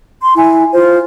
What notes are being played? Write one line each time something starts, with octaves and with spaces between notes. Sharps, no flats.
C6
E4 G#5
F4 C5